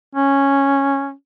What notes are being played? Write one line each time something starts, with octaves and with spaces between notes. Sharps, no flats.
C#4